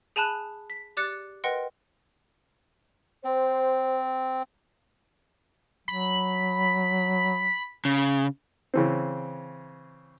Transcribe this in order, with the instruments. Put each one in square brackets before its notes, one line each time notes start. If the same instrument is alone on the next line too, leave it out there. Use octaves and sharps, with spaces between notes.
[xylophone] G#4 G#5 A5 B5 F#6
B6
G4 D5 D6 F#6 A6 C#7
A#4 B4 D#5 F#5 G5 C6
[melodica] C4 [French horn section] C5
[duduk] F#3 [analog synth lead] B5
[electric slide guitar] C#3
[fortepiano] C#3 E3 C4